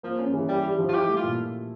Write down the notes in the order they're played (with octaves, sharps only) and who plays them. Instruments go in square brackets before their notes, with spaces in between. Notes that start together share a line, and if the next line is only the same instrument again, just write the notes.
[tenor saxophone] F3 [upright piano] A#3
[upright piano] C#4
E3
[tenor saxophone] G3 [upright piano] G4
[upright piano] G4
F3
[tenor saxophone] F4
[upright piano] E4 [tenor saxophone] G4
[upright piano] A3
[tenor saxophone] F4
[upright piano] A#2